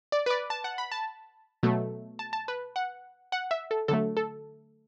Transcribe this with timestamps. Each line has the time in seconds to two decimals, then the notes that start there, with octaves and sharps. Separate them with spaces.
0.12 D5
0.26 B4
0.30 D5
0.50 A5
0.64 F#5
0.78 B5
0.92 A5
1.63 B2 F#3 A3
2.19 A5
2.33 A5
2.48 B4
2.76 F#5
3.32 F#5
3.51 E5
3.71 A4
3.88 D3 F#3 A3 A4
4.17 A4